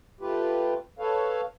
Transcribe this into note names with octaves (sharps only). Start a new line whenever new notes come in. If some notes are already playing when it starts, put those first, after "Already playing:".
A3 F4 G4 B4
A4 B4 C#5 F5